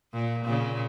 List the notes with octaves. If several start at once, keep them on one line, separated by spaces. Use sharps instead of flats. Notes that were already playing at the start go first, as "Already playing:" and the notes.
A#2
A#2 C#3